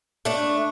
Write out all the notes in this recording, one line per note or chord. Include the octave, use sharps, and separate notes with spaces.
A3 D4